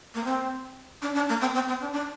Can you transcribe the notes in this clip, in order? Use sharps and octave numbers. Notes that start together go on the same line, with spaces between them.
A#3
C4
D4
D4
A#3
C4
C4
C4
D4
D4